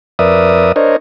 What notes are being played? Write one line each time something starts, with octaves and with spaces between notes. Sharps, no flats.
F2 A#4 B4 D5 E5 D#6
D4 A#4 C5 C#5 D#5